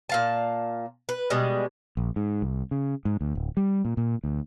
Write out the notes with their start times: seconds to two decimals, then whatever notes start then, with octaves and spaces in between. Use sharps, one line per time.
0.09 A#2 F5 A5
1.09 B4
1.30 B2 G3 G#3
1.97 A#1
2.16 G#2
2.42 C2
2.71 C#3
3.05 G#2
3.21 D2
3.35 D1
3.57 G3
3.85 A#2
3.97 A#2
4.24 D2